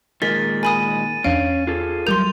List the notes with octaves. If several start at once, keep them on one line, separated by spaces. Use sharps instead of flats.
A#2 D#3 G#3 A#4 D#5 A6 B6
A#4 G#5 B5 D#6 D#7
E2 C#4 D4 F5 D7
F4 G#4 A4
F#3 G3 A#4 C6 G6 F7